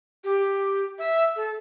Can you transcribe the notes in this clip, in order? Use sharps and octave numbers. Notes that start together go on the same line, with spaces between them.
G4
E5
A4